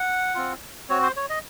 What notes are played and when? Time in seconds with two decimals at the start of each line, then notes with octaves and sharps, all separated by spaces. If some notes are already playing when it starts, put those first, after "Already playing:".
Already playing: F#5
0.35 C4 F4
0.89 C4 F#4 C#5
1.02 C5
1.17 C#5
1.30 D#5